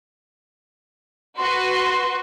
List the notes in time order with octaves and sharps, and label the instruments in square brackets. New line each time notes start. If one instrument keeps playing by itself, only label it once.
[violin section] F#4 B4 [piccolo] C6